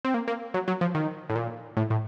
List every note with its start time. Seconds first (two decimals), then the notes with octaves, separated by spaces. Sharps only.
0.05 C4
0.14 A#3
0.28 A#3
0.54 F#3
0.68 F#3
0.81 F3
0.95 D#3
1.30 A2
1.35 A#2
1.77 A2
1.90 A2